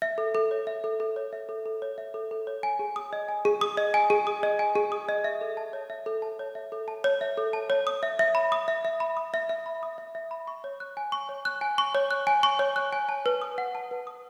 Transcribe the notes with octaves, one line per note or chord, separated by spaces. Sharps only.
E5
A4
A4
C#5
E5
A4
A4
C#5
E5
A4
A4
C#5
E5
A4
A4
C#5
G#5
G#4
D#6
D#5
G#5
G#4
D#6
D#5
G#5
G#4
D#6
D#5
G#5
G#4
D#6
D#5
E5
A4
A5
C#5
E5
A4
A5
C#5
E5
A4
A5
C#5
E5
A4
A5
C#5
D#6
E5
E5
B5
D#6
E5
E5
B5
D#6
E5
E5
B5
D#6
E5
E5
B5
C#6
C#5
F#6
G#5
C#6
C#5
F#6
G#5
C#6
C#5
F#6
G#5
C#6
C#5
F#6
G#5
A5
B4
D#6
F#5
A5
B4
D#6